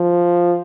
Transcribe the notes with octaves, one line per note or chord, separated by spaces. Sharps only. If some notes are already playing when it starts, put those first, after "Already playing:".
Already playing: F3